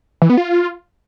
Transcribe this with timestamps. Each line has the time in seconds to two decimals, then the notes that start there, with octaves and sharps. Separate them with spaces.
0.22 E3
0.30 B3
0.37 F4